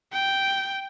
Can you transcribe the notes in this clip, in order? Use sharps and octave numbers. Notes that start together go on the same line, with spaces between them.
G5